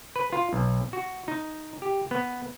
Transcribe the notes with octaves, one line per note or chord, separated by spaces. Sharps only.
B4
F4
B1
F#4
D#4
G4
B3